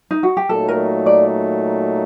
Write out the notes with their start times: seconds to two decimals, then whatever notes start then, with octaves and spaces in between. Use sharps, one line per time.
0.11 D#4
0.23 F#4
0.37 G4
0.49 A#2 F#3 A3 D#4 A4
0.68 A#4
1.06 D5